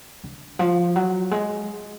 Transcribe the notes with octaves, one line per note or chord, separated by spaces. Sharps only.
D3
F3
F#3
G#3